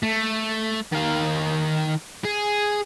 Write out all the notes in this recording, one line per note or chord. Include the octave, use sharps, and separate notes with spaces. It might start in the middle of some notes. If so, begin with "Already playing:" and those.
A3
D#3 F5
G#4